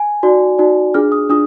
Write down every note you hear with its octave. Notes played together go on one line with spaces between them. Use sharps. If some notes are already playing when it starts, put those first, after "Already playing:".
Already playing: G#5
D#4 F#4 D5
D#4 F#4 D5
D4 F4 G#4 F6
D#6
D4 F4 D#6